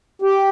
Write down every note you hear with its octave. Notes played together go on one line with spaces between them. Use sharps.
G4